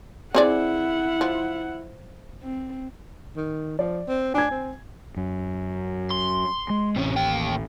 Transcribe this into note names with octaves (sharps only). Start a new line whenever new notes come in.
C4 E4 G#4 D5 F#5
F3
C4
D#3
F3 D5
C4
D4 G#5 G#6
C4
F#2
C6
G#3
A1 C3 C#4
D#2 G5